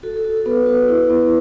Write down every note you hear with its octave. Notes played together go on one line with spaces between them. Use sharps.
F#4 A4
A4
F#4
A4
B3 B4
F#4 B4
E4
B3